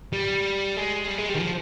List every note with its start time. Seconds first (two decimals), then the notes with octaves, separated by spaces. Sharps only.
0.13 G3
0.76 G#3
1.08 G3
1.18 G#3
1.30 G3
1.35 D#3
1.40 F3